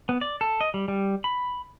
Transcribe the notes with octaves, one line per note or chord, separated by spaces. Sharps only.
B3
D5
A4
D#5
G3
G3
B5